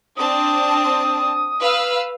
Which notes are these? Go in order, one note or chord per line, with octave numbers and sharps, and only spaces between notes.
C4 D4 A5 D#6
B4 F5 E6